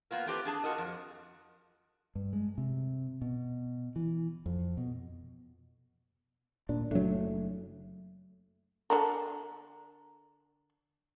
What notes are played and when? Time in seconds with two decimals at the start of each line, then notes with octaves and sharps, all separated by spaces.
0.11 A#3 B3 F4 A#4
0.26 A3 C4 G4 B4
0.45 D4 G#4 A5
0.64 F4 F#4 A#4 D#5
0.78 F2
2.15 G2
2.33 G#3
2.58 C3
3.22 B2
3.96 E3
4.46 F2
4.77 B2
6.69 D#1 A#2 D4
6.91 F#1 F#3 A3 D4
8.90 D3 D4 A#4